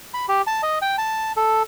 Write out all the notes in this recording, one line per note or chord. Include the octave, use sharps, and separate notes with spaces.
B5
G4
A5
D#5
G5
A5
A4